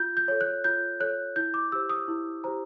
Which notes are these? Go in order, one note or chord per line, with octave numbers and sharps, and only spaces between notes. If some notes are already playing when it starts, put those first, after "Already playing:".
Already playing: F4 G6
G6
A4 C#5
F#6
F4 G6
A4 C#5 F#6
E4 G6
D6
G4 C5 E6
D#6
E4
G4 C5 A#5